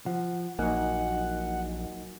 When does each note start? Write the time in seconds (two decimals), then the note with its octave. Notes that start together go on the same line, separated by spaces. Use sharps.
0.06 F3 F#5
0.59 A#1 F#3 A#3 D#4 D#5 F#5 G#5